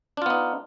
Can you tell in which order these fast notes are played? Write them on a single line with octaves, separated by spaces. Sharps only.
D4 F4 B3 D#4